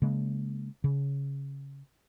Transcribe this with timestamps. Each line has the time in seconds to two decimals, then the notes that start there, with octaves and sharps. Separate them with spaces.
0.02 C#3 G#3 A#3
0.84 C#3